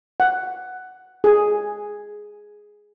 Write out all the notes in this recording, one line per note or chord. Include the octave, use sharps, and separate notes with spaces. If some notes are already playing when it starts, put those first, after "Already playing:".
F#5
G#4